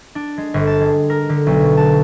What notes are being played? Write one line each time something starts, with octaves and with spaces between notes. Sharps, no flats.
D4
G#3
G1
A5
G#3
A#4
D3
B1
B2
A5